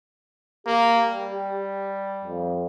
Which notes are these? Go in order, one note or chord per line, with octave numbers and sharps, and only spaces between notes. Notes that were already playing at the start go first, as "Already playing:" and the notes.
A#3 G4
G3
F2